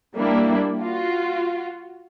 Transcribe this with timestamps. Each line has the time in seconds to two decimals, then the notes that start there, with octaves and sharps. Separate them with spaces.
0.16 G3 A#3 D4 E4 G4
0.79 F4 F#4